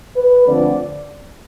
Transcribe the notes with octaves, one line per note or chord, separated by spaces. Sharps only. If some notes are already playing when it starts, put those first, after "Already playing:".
B4
D3 F3 A3 C4 D5